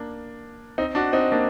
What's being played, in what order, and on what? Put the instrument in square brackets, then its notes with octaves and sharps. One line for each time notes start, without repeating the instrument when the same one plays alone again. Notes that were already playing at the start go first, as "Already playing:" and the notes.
Already playing: [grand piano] A#3 D4
C4 D#4
D4 F#4
C4 D#4
A#3 D4